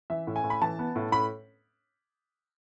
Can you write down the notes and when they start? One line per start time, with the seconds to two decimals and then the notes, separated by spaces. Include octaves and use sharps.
0.10 E3 E5
0.27 A2
0.36 G#5
0.44 A2
0.50 B5
0.62 E3 A5
0.79 B3
0.96 A2
1.12 A2 B5